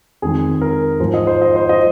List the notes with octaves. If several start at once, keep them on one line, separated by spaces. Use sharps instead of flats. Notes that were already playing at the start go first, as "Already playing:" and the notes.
F2 D#3 G#3 G#4
A#4
G#2 F3 G#3 C5
D#5
C5
D#5
C5
D#5